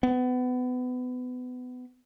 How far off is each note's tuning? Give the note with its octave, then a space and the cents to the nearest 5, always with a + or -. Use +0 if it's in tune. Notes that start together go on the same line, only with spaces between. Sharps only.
B3 +25